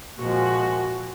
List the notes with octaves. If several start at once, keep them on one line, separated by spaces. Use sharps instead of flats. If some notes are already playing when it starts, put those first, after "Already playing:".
A#2 F3 G#3 F#4